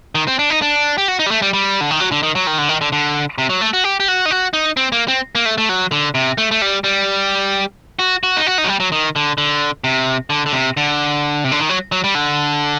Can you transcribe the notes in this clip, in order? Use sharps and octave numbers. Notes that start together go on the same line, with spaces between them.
D#3
C4
D4
D#4
D4
G4
F#4
D#4
G3
A3
G3
G3
D3
D#3
F#3
D3
D#3
F#3
D#3
D3
D#3
D3
D3
C3
F#3
A3
F#4
G4
G4
F#4
D#4
F#4
D#4
C4
A#3
C4
A#3
A3
A3
F#3
D3
C3
A3
A3
G3
G3
F#4
F#4
D#4
F#4
D#4
F#3
G3
F#3
D#3
D3
D3
C3
D3
D3
C3
D3
C3
D3
D#3
F#3
F#3
G3
D3